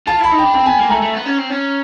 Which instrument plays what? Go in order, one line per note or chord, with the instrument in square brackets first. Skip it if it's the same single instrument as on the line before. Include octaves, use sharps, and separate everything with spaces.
[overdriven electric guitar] F4 [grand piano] A5
[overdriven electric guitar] E4 [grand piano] B5
[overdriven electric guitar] D#4
[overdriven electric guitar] D4 [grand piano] G5
[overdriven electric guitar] C4 [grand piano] G5
[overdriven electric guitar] B3 [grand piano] G#5
[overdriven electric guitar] A#3
[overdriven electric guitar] A3 [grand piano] A#5
[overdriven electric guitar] A3
B3
C#4
C4
C#4